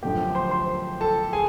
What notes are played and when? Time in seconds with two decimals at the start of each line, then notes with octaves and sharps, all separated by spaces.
0.03 F#2 D3 F3 A3 G4 G5
0.35 C5 C6
0.51 C5 C6
1.01 A4 A5
1.33 G#4 G#5